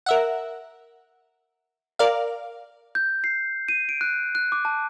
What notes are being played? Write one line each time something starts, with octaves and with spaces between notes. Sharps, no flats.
A#4 E5 F#5
A#4 D5 F5
G6
C7
D#7
D7
F#6
F#6
D6
A5